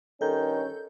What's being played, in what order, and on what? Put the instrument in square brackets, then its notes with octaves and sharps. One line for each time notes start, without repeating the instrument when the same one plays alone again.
[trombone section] G2 C#4 [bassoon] D#3 [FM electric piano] A4 G6